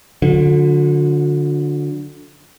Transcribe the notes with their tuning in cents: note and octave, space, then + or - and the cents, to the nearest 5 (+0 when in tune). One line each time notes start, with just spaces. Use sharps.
D3 +0 F#3 -45